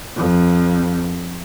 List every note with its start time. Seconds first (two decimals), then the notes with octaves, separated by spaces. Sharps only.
0.16 F2